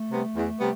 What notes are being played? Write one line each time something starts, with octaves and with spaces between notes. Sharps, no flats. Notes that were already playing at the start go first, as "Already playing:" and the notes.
Already playing: A3
C3 G3 B3
E2
C3 G3 B3